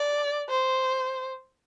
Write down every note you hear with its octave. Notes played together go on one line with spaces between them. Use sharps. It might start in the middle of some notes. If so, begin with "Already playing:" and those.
Already playing: D5
C5